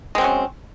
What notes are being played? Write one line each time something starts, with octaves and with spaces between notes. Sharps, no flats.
F#3 G#3 C4 C#4